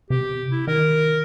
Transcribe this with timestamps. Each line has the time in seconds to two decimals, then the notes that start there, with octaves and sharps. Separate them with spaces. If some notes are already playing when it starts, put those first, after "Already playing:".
0.10 C3 G4
0.52 E4
0.67 D#3 A#4